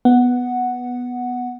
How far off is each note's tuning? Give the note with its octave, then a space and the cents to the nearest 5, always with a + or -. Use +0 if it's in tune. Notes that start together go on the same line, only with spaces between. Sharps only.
B3 +0 F#5 +0